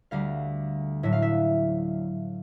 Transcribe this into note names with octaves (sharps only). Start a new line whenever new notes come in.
D2 D3 G3 F5
A2 F#3 E5
F5
E5